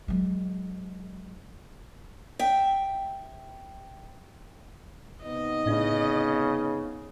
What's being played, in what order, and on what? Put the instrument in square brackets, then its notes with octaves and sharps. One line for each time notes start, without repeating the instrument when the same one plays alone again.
[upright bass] F#3 G#3
[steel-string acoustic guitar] E5 G5
[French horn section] C3 B3 D#4 [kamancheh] D#5
[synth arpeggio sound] A2 D4 E4 [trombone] C#3